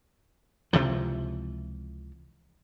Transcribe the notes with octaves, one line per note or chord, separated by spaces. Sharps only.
C#2 C3 E3 F3